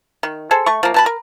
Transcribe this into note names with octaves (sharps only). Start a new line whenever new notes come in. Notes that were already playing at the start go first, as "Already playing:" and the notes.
D#3
G#4 A4 C5
A3 C#6
F3 A#3
B2 A5 B5
A#4